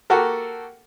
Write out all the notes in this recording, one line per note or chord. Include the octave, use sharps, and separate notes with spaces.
A#3 F#4 G4 A4 A#4